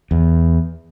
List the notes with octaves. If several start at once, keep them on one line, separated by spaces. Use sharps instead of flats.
E2